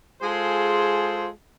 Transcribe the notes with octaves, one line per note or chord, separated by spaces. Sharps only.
G#3 F4 G#4 A4 C5